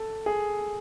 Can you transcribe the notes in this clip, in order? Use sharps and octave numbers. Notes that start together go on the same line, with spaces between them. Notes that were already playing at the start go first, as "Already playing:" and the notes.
Already playing: A4
G#4